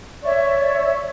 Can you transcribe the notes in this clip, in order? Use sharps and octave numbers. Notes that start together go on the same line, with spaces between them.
C#5 D5 E5 C#6